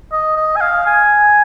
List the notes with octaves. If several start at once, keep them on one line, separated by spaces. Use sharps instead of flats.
D#5
D#5
G#5
F5
G#5